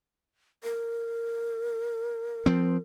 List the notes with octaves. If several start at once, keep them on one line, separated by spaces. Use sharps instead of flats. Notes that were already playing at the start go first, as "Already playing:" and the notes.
A#4
F3 C4